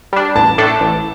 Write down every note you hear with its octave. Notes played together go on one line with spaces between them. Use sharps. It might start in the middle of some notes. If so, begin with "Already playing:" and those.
G3 D4
A1 A5
A2 A3 D4 A4
A1